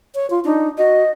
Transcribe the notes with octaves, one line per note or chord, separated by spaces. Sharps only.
C#5
F4
D4 D#4
F#4 D#5